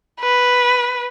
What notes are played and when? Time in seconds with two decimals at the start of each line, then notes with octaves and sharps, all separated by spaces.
0.20 B4